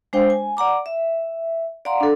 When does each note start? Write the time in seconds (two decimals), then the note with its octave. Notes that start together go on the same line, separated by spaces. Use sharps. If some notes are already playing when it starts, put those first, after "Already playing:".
0.13 G#3 D4 C5 F5 G5
0.30 G#5
0.57 D5 F#5 A#5 D6
0.86 E5
1.85 D5 F5 F#5 A#5 C6
2.00 D4 A4